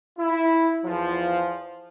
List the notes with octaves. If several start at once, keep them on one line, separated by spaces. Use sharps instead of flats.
E4
E2 F3